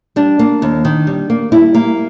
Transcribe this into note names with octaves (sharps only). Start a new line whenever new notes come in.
G3 D4
A#3
D#2
D#3
G3
A#3
G3 E4
A#3